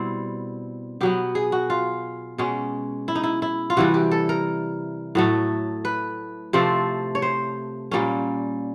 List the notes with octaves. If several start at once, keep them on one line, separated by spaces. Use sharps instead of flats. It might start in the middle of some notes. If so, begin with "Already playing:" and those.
Already playing: B2 G3 C4 E4
B2 F#3 B3 G4
G#4
F#4
F4
B2 G#3 C#4
E4
D#4
E4
E4
F4
C3 E3 G3 F#4
G4
A4
A#4
A2 F#3 A3
B4
C3 F3 A3 C4
C#5
C5
A#2 G3 A#3 C#4